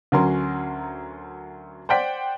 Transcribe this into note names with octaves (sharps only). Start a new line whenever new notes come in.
D2 F#3 C#4 A#4 C6
C5 D5 F#5 G5 B6